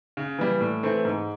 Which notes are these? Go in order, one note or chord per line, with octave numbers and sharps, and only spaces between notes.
C#3
E3 G3
A2
E3 A3 C4
G#2